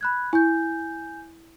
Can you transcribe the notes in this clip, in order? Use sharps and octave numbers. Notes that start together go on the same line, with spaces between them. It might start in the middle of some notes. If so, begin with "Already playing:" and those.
B5 F#6 G#6
E4 G#5 G6